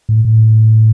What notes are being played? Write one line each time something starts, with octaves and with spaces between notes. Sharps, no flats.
A2
A2